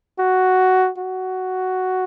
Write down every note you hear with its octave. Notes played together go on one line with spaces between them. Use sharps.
F#4
F#4